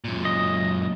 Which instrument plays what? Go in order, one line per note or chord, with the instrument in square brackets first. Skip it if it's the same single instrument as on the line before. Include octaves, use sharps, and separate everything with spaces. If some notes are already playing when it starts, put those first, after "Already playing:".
[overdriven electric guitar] F#2 A#2
[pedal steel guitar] D#5